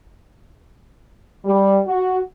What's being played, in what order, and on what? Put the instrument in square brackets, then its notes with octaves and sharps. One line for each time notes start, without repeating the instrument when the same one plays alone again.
[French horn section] G3
F#4